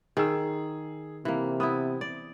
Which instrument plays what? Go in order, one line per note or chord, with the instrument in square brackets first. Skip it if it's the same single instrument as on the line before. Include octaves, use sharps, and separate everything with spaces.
[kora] D#3 [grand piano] G#4 E6
[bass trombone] C3 [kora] E3 A#3
[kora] B3 E4 [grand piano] D#6
[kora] D5